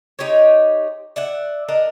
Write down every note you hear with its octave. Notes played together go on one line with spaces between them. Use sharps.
D#4 G4 C5 C#5
D5 E5 F#5
D4 A#4 D#5